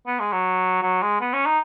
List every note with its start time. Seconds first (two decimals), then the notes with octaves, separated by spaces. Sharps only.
0.07 B3
0.19 G#3
0.32 F#3
0.82 F#3
1.02 G#3
1.21 B3
1.33 C#4
1.46 D#4